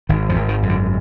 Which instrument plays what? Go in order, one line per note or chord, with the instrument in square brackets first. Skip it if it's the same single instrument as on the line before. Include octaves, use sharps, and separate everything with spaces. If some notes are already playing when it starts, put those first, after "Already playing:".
[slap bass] G#1 D#3
F2 F3
G#1
D#3
F#2
D3